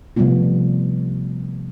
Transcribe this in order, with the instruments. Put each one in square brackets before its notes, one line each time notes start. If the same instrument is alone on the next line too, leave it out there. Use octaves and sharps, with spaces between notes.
[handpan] C3 F3 G3 A3 B3 F4